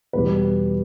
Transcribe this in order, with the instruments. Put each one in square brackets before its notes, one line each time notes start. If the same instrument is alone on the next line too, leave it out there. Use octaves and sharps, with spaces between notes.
[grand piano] E2 B2 G3 B4